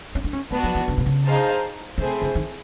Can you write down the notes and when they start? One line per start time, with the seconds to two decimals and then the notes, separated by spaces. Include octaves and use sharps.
0.15 C#4
0.24 D4
0.33 C#4
0.51 A3 B3 D4 F#4
0.64 F#3
0.75 E3
0.88 D3
0.98 C3
1.06 C#3
1.25 D#4 G#4 C5 F5 A5
1.98 C#3 A3 C4 E4 G#4 C5
2.22 D3
2.35 D#3